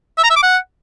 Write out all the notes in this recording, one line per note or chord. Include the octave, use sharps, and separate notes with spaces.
E5
A#5
E5
D6
F#5